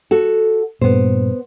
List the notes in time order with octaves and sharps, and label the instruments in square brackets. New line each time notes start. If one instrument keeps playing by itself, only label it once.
[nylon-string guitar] F#4 A4
[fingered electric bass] G2 A#2 [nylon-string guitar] B3 C5